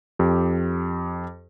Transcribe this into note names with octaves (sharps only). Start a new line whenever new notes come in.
F2 G4